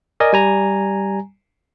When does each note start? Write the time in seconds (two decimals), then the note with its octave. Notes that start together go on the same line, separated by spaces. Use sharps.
0.20 A#4 D5 D#5 G#5
0.33 G3 G#5 A#5